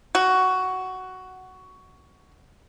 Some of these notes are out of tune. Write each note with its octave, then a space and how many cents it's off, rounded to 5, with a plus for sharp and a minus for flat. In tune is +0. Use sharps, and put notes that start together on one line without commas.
F#4 +10